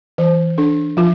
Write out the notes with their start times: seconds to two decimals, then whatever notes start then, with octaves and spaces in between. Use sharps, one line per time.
0.18 E3 C5
0.58 D4 A4
0.97 F3 F4